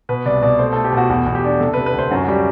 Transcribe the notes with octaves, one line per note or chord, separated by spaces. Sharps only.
B2 B4
C2 D5
B2 D5
A3 C5
A3 A4
G4
B2 F#4
E2 F#4
E2
G4
D4
C3 A4
C3 B4
B4
D2 C5
F#2 F#4
F#4
G3 G4